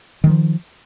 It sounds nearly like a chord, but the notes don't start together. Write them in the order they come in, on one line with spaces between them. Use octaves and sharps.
D#3 F#3 F3